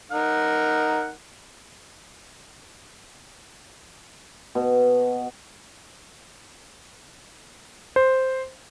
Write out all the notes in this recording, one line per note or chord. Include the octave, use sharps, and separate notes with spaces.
D#4 A#4 F#5
B2
C5